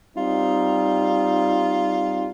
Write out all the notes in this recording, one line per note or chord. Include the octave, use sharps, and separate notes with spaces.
G3 C4 D#4 F4